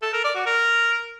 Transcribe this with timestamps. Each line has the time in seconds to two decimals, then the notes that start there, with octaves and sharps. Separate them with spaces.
0.02 A4
0.13 A#4
0.24 D5
0.35 F#4
0.46 A#4